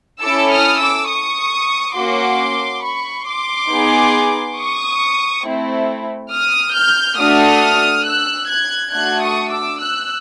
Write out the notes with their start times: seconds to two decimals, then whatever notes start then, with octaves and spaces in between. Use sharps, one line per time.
0.22 C#4 E4 A4 D6 E6
0.51 D#6 F6
0.80 D6 E6
1.09 C#6 D#6
1.96 A#3 C#4 F#4 C6 D6
2.84 B5 C#6
3.27 C6 D6
3.71 B3 D#4 G#4
4.58 C#6 D#6
5.45 A3 C4 E4
6.32 D#6 F6
6.75 F6 G6
7.19 A3 D4 F#4 A4 D#6 F6
8.06 E6 F#6
8.50 F#6 G#6
8.93 A3 D4 F#4 F#6 G#6
9.22 C#6 D#6
9.51 D6 E6
9.80 E6 F#6